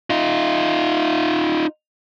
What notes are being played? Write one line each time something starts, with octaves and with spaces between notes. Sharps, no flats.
D#4 F4